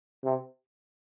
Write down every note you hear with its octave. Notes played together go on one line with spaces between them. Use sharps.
C3